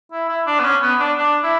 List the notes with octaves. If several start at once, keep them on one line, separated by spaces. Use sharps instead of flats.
E4
E4
D4
B3
C#4
B3
D4
D4
E4